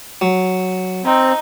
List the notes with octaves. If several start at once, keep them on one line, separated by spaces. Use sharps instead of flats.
F#3
C4 D#4